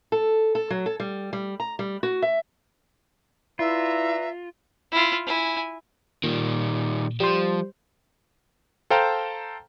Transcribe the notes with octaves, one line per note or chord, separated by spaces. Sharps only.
A4
A4
F#3
A4
G3
G3
A#5
G3
F#4
E5
E4 F4 B4 D5 E5 A#5
E4 F4
E4 G#5
A#2 D#3 G3
F3 G3 C5
A4 C5 F5 G5 A5 A#5